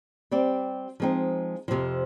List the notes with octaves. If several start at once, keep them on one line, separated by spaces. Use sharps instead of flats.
G3 C4 G4 D5
F3 G#3 C4 D#4
F2 C3 F3